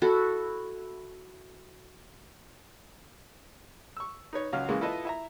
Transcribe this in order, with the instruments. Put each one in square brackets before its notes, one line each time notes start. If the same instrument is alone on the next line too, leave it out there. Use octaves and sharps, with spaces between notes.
[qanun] E4 F#4 A4
[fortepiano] C#6 E6
D#4 B4 C#5
C#2 F#3 F5 F6
C#3 E3 G#3 A#3
E4 F4 A4 B4 D#5 E5
E4 E5 A#5